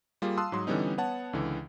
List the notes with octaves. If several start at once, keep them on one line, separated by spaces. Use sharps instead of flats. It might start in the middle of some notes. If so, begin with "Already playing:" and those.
G3 A#3 F4 G#4
F5 A5 C6 D#6 E6 F#6
G#2 F#3 C6
D3 E3 G3 B3 C#4 D#4
B3 C#5 F#5 A5
C#2 D3 E3